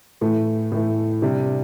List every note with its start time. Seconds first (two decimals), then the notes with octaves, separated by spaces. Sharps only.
0.21 A2 E3 A3
0.72 A2 E3 A3
1.22 C3 G3 D4